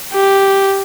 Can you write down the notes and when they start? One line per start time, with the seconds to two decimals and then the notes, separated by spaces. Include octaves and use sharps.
0.13 G4